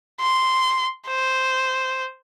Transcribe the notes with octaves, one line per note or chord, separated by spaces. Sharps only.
C6
C5